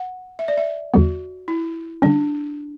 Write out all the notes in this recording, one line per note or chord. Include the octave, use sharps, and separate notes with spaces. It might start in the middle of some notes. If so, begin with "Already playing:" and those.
Already playing: F#5
E5
D5
E5
E2 D3 G3 B3 F#4
E4
D3 G3 C#4 D4